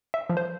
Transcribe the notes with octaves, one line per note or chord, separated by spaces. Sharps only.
E5
F3
C5